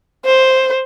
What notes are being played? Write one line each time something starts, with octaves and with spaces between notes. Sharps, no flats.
C5